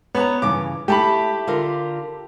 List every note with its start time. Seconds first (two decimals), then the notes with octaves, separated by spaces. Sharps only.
0.15 B3 C#5 A5 A#5
0.42 G2 C#3 E3 D6
0.88 A3 E4 G4 E5 A5 B5
1.47 D3 F4 A#4